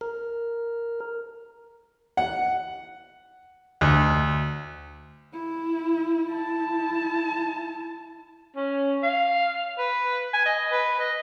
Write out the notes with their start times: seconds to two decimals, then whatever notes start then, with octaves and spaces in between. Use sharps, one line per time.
0.01 A#4
2.17 F#5
3.81 D2
5.33 E4
6.31 E4 A5
8.56 C#4
9.03 F5
9.78 B4
10.34 G#5
10.46 D#5
10.72 B4
11.00 D#5